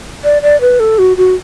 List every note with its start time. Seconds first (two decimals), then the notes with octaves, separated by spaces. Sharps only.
0.24 D5
0.42 D5
0.61 B4
0.80 A4
0.99 F#4
1.17 F#4